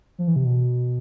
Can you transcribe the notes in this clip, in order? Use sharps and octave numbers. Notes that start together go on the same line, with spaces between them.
F3
E3
C3
B2